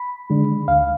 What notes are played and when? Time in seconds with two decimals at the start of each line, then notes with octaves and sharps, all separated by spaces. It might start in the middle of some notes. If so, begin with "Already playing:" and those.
Already playing: B5
0.30 D3 G#3 D4
0.68 D2 F5